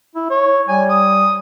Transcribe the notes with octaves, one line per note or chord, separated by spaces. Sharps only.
E4
C#5
G3 G#5
D#6